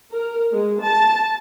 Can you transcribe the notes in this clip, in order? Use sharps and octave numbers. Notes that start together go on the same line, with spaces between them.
A#4
G#3
A5